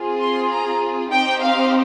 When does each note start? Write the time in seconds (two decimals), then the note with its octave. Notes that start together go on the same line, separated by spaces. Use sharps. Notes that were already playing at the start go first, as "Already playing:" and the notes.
Already playing: C4 F4 G#4
0.20 C6
0.51 A#5
1.12 C4 D#4 G4 G5
1.43 F5